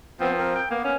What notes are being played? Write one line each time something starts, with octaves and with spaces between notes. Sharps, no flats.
F3 B3 C4
C4 A#4
G5
A#3 B3
C#4